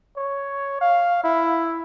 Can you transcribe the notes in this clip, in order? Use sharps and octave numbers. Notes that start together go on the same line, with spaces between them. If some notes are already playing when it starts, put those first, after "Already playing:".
C#5
F5
E4